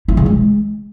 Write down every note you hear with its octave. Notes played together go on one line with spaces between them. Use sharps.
E4
C#3
G#3